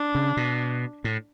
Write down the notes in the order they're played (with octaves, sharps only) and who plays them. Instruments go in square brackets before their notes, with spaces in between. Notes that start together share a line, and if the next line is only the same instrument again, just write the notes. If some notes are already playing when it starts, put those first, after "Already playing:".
Already playing: [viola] D4
[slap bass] C#3
B2
A2